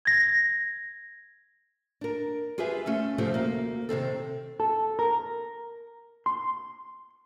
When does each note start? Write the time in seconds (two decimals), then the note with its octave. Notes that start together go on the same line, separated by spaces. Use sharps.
0.05 G#6 A#6
2.01 D4 A#4
2.58 F4 G4 G#4 B4 E5
2.86 A3 C#4 F4
3.18 C3 F3 A3 C4 F4 G4
3.34 D2 A#3
3.89 C3 D#3 C4 A4
4.60 A4
4.99 A#4
6.26 C6